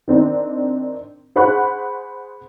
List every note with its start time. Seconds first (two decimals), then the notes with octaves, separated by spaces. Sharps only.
0.08 D#3 C4 D4 D#4
1.36 G#4 C5 F#5 B5 C#6 F#6